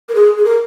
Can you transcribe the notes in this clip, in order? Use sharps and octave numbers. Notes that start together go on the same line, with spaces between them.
A#4
G#4
G#4
A#4